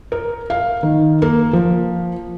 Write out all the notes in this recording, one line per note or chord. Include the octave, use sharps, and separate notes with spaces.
A#4
F5
D#3
A#3
F3